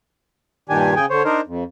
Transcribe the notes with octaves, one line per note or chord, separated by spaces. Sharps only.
G2 A#2 D#3 D4 G4 G#5
C#3 G#4 G5 G#5
D3 C5 C#5
D4 D#4 A#4 C5
F2